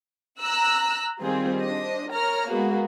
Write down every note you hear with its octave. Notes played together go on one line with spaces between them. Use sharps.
A#5 E6 F#6
D#3 G3 C4 F4 G#4
D4 C5 D#5
A#4 C#5 A#5 F6
G#3 A#3 B3 F#4 G#4